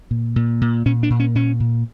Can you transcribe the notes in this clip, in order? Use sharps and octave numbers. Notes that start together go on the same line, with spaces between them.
A#2
A#2
A#2
A#2 C#4
D4
A#2
C#4
A#2 C#4
A#2